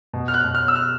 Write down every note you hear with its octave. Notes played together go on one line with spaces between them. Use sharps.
B2
F6
F#6
B2
F6
E6
F6